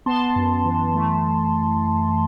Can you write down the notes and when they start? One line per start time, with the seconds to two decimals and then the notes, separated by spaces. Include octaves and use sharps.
0.06 B3 A5 C6
0.36 F#2
0.65 E3
0.95 A3